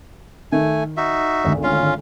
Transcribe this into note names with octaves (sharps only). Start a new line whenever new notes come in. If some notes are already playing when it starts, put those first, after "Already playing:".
D#3 A3 G#5
D#4 F#4 E5
G#1 D2
C#4 F4 F5